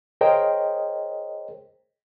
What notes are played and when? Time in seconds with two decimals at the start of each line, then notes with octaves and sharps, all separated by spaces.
0.21 G#4 A#4 C5 C#5 D#5 G5